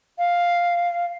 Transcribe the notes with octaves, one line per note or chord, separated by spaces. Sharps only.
F5